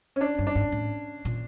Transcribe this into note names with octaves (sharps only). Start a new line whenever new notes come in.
C#4
D4
G2
D4
G#2
A2
A#2